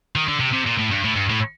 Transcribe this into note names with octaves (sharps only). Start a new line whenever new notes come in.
D#3
D3
C3
C3
A#2
A2
G2
A2
G2
A2